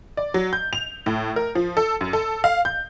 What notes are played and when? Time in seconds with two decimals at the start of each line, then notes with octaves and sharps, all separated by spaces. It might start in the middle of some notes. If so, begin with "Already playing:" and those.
0.17 D5
0.34 F#3
0.53 G6
0.73 F7
1.06 A2
1.36 A#4
1.55 F3
1.77 A4
2.01 F#2
2.13 A4
2.44 F5
2.65 G6